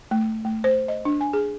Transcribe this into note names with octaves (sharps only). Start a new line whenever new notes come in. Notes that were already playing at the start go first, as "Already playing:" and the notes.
A3
A3
C5
D#5
D4
G#5
G#4